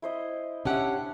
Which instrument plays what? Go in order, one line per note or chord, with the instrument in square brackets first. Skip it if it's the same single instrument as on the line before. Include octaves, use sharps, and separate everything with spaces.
[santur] E4 C5 D#5
[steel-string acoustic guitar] C#4 G4 F#5 [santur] D4 E5